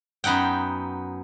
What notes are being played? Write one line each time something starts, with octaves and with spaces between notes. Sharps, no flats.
F#2 B3 D#4 F#5 G5